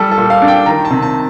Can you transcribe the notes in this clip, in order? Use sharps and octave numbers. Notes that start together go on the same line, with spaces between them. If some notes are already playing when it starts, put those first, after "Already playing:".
Already playing: G3 A4
A4
A#2
F5
D4
G5
D#3 A#5
A5
C3
A5